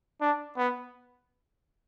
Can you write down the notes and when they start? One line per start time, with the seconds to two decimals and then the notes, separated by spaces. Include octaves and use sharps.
0.21 D4
0.57 B3